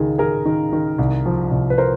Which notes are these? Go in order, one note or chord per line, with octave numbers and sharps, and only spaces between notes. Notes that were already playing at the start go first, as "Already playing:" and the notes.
Already playing: C#2 D#3 G#4
D#3 G#4 A#4
D#3
D#3
C2
F3
C2
B4
A#4 C5